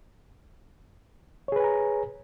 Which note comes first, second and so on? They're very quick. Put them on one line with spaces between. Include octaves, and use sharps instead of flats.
C#5 G#4 B4 G#5 A#5